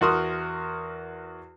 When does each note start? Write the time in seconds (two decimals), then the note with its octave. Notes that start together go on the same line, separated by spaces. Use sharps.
0.01 E2 F#4 A#4 C6 D#6 F6